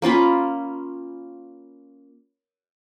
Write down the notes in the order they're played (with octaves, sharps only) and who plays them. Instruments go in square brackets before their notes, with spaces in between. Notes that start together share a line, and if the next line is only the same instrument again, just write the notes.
[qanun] A#3 C#4 F4 B5